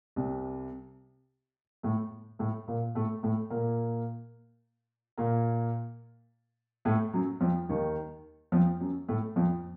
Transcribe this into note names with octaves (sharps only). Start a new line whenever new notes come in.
C2 C3
A2 A3
A2 A3
A#2 A#3
A2 A3
A2 A3
A#2 A#3
A#2 A#3
A2 A3
F#2 F#3
F2 F3
D#2 D#3
F2 F3
F#2 F#3
A2 A3
F2 F3